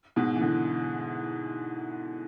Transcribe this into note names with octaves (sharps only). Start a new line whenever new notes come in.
G#2 B2
E3
B2 D3